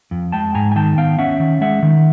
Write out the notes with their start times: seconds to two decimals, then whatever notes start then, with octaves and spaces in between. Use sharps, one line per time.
0.11 F2
0.32 G#3 G5 A5
0.55 G#2 G#5 A#5
0.72 G#5
0.76 D#3 G5 A5
0.97 B3 F5 G5
1.19 C#4 E5 F#5
1.40 D#3
1.61 G#3 E5 F#5
1.83 D#3